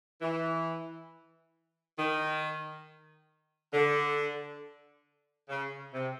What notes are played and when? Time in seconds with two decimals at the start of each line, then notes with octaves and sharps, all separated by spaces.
0.21 E3
1.97 D#3
3.73 D3
5.49 C#3
5.93 C3